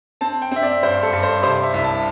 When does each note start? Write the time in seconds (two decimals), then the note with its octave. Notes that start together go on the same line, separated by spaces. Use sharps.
0.21 C4 A5
0.42 G5
0.51 C4 E5
0.62 D5
0.83 G2 C5
1.03 A4
1.13 G2
1.23 C5
1.43 C3 C5
1.63 E5
1.74 C2
1.84 A5